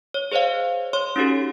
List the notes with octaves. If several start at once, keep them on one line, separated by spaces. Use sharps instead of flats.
C#5
G#4 C5 C#5 D#5 F5
C#5 C6
C#4 D#4 F#4 G4 A4